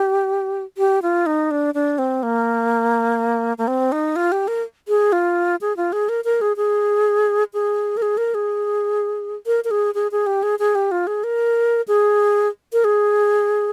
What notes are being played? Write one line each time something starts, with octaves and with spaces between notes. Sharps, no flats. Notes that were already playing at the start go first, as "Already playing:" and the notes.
Already playing: G4
G4
F4
D#4
D4
D4
C4
A#3
A#3
C4
D#4
F4
G4
A#4
G#4
F4
G#4
F4
G#4
A#4
A#4
G#4
G#4
G#4
A#4
G#4
A#4
G#4
A#4
A#4
G#4
G#4
G#4
G4
G#4
G#4
G4
F4
G#4
A#4
G#4
A#4
G#4